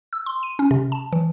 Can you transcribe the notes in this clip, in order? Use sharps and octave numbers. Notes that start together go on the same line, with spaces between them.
E6
C6
D#7
C#4
C3
A5
E3